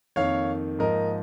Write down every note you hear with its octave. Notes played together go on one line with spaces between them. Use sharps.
F2 D#3 A#3 C#5 F5
G#2 F3 A#3 A#4 D#5